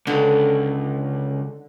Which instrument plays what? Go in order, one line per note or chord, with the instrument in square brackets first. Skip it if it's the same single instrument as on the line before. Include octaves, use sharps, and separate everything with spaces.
[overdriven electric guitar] C#2 [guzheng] D3